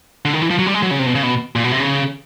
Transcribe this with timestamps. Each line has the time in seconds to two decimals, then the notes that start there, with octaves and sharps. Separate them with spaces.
0.25 D3
0.33 D#3
0.41 E3
0.50 F3
0.59 F#3
0.66 G3
0.74 G#3
0.83 F#3
0.91 C#3
0.99 C3
1.06 B2
1.15 C#3
1.23 B2
1.56 A#2
1.64 B2
1.72 C3
1.80 C#3